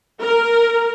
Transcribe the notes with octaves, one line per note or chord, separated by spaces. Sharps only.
A#4